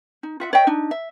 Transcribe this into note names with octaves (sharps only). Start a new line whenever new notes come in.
D#4
F4 E5 F#5
C#5 D#5 E5 G5
D4 D#4
E5